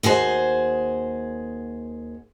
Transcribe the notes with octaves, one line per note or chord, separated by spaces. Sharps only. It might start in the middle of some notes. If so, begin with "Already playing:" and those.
D#2 F#4 G#4 C5